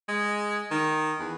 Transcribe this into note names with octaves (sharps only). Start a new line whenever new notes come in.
G#3
D#3
E2